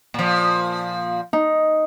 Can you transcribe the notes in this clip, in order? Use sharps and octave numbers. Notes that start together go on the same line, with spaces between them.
A#2 F3
D#4